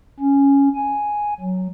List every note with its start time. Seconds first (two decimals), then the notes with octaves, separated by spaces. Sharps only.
0.20 C#4
0.75 G#5
1.41 F#3